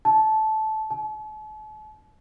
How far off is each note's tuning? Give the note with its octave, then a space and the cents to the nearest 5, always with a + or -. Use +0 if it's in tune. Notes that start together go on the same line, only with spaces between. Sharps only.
A5 -15
A5 -45